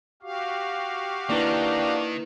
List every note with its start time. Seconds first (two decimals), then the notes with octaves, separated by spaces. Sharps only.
0.23 F#4 G4 F5
1.29 D#3 A#3 D4 E4 B4